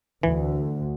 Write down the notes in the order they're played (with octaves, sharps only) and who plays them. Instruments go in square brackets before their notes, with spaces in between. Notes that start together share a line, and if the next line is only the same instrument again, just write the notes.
[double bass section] D2 [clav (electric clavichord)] E3